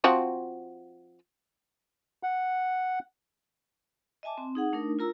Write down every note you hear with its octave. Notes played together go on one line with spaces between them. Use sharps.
F3 C4 F#4
F#5
D#5 E5 G#5 A5 D6
C4
D#4 G#4 F#5
A3 D4 D#4 A#4
F4 A#4 A#5 E6